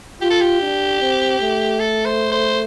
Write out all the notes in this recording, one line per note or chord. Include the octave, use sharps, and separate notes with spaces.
F4 G4
A4
G4
D4
C4
A3
A4
C5
C5